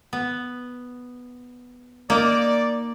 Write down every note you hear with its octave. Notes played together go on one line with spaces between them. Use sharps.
B3
A#3 D#4 D5